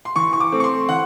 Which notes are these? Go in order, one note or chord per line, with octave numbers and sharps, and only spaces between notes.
C6
E3 C#6
C#6
D6
A3 C4
C#6
C6
E3 F#5